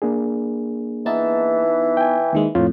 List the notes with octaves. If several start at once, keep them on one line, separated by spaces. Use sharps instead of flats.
A#3 D4 G#4
E3 B3 D#4 A5
G5 G#5
D#2 D#3 G#3
F2 A2 F4 C#5